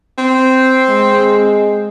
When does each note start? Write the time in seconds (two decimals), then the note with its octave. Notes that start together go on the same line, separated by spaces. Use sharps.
0.18 C4
0.90 G#3